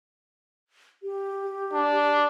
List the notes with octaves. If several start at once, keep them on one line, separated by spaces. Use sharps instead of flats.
G4
D4